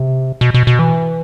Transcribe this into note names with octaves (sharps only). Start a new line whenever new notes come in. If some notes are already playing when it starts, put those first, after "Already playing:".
Already playing: C3
B2
B2
B2
E3